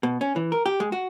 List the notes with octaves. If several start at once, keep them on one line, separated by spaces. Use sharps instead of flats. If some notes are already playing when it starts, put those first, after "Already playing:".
B2
C#4
E3
A#4
G4
G#3
F#4